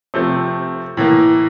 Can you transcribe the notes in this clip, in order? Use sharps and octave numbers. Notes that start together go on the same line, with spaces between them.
C3 F3 A3 C4
A2 E3 A#3